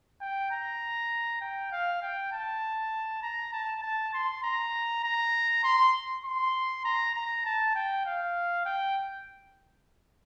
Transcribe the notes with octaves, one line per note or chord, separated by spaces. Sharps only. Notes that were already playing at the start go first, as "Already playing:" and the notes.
G5
A#5
G5
F5
G5
A5
A#5
A5
A5
C6
A#5
A#5
C6
C6
A#5
A#5
A5
G5
F5
G5